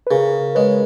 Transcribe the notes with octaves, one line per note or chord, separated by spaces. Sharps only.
B4
C#3 G#4 A#4
G#3 B4 C#5